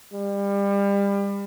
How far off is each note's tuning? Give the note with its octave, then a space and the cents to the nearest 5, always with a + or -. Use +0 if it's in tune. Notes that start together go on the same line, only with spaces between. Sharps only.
G3 +30